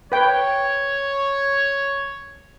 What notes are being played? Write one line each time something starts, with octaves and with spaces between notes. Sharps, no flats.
B4 C#5 G5